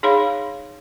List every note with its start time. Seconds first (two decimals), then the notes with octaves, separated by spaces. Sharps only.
0.03 D#4 G#4 C#5 F5 B5